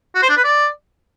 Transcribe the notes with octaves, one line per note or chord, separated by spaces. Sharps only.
F#4
C5
D4
B4
D5